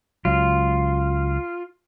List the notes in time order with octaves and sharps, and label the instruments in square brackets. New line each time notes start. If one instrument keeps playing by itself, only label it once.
[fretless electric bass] C#2 F#3 [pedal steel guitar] F4